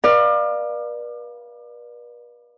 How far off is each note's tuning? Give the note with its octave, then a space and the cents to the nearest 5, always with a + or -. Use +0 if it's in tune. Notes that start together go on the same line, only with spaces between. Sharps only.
B4 -45 D5 +30 F5 +0